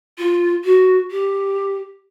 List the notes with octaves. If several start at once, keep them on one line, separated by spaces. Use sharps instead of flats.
F4
F#4
G4